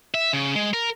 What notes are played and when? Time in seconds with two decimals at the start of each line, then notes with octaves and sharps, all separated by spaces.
0.14 E5
0.33 C#3
0.56 G#3
0.74 A#4